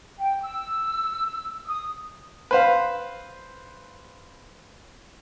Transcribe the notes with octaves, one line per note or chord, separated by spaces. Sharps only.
G5
E6
D#6
B4 C5 F5